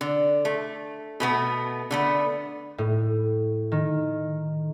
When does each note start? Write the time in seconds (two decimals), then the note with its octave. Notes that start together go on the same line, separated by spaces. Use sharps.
0.01 D3
0.45 A3
1.20 B2 A3 B3
1.91 D3 A3 B3
2.78 A2
3.72 D#3